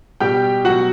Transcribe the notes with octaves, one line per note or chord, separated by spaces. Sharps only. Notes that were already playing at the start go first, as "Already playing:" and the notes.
B2 G3 G4 G5
B2 F#3 F#4 F#5